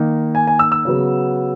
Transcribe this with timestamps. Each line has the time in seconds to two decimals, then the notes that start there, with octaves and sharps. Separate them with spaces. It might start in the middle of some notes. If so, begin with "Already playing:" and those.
Already playing: D#3 A#3 D#4
0.35 G#5
0.47 G#5
0.59 E6
0.72 E6
0.85 C#3 F#3 B3